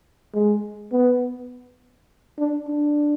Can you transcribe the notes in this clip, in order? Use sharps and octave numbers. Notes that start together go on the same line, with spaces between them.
G#3
B3
D4
D4